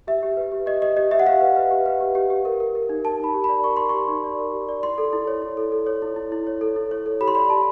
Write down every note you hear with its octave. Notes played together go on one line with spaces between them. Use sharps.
G4 E5
G4
B4
G4
G4 D#5
G4 D#5
G4 D#5
G4 E5
F#5
G4 F5
B4
B4
G4
B4
G4
G4
G4
A#4
A#4
A#4
D#4
A#4 A5
D#4 B5
G4
D5 B5
A#4 C#6
A#4 C6
G4 C#6
D#4
D5
A#4
G4
D5
E4 C6
A4
E4
C#5
E4
A4
A4
C#5
E4
E4
E4
C#5
A4
E4
C#5
A4
G4 B5
C6
D5 B5
G4 A5